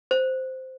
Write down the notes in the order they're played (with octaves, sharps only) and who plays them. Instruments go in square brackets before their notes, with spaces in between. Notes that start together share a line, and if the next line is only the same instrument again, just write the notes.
[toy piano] C5